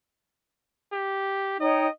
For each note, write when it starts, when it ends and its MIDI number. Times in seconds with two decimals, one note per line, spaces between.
0.93 1.58 67
1.60 1.87 63
1.60 1.87 73
1.60 1.90 75
1.60 1.87 79